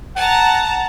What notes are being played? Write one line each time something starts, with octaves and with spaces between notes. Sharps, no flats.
F#5 A5 A#5